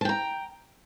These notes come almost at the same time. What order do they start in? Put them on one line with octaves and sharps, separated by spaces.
A5 G5 A#5